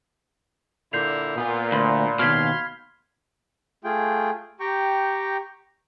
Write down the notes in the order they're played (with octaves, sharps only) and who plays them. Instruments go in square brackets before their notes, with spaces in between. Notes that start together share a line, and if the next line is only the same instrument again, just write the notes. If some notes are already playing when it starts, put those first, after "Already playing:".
[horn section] A#2 D3 E4 [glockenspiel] G6 C7 F7
[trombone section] A#2 [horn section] B3 F4
[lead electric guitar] D2 [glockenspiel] B5 C6
[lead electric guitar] D#2 B2 [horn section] F5 C6 [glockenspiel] F6 G#6 B6
[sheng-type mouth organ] A3 F4 G#4 G5
G4 G5 A#5 C#6